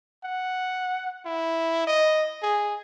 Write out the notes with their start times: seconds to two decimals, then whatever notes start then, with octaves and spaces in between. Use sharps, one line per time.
0.24 F#5
1.25 E4
1.87 D#5
2.42 G#4